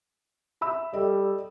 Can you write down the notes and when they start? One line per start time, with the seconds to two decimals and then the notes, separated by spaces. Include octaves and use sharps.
0.61 E5 B5 E6
0.94 G3 A4 D#5